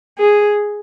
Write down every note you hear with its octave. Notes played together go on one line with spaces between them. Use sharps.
G#4